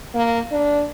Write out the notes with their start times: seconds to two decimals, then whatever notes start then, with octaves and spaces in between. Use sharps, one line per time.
0.14 A#3
0.51 D4